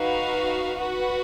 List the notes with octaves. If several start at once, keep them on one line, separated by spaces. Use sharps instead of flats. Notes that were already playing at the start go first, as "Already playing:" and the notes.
Already playing: D#4 F#4 B4 F5
F#4 B4 F#5